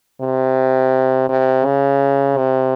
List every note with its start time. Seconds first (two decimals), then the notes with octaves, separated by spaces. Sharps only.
0.21 C3
1.29 C3
1.65 C#3
2.37 C3